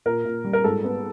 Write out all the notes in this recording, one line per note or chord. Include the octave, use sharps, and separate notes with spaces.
A#2 A#4
A#2
G3
A#4
G#2 A4
B3